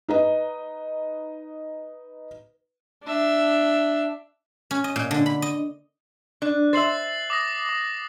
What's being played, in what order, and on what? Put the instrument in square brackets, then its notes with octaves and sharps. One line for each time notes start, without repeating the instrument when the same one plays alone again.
[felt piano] D#4 B4 D#5
[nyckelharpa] D4 E5
[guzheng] C#4
D#5
A#2
D3
B5
D#5
[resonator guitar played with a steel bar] D4 [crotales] F#6
[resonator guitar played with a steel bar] C5 E5 [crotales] A6 C7 F#7
[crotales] D6 D#6 A#6
D6